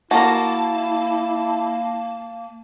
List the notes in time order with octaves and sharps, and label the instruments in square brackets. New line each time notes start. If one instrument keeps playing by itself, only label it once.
[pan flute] A#3 [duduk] E4 [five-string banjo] F#4 A#4 [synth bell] A5